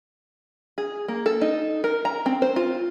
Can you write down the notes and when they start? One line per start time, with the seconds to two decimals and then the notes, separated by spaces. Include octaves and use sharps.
0.78 G#4
1.08 A#3
1.26 A4
1.41 D#4
1.84 A#4
2.05 A#5
2.26 C4
2.42 C5
2.56 F4